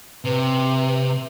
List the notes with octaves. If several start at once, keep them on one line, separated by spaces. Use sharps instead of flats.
C3 B4